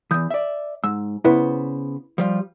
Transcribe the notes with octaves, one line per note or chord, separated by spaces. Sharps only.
E2 E3 D#6 G6
D5 E5
G#2 E6
C#3 B3 E4 B4 C5
F3 G3 F4